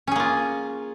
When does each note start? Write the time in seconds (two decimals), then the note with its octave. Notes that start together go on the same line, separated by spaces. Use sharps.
0.07 C#4
0.12 G#4
0.16 A#3
0.20 F4